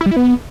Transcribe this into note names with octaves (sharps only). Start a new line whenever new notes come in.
E4
G3
E4
B3